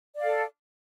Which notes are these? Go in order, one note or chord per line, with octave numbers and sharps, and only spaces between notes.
A4 D5 F5